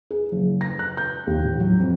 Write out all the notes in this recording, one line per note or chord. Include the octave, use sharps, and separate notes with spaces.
G#4
F#1
A#6
F#6
G6
D#2
A1
F#3
F2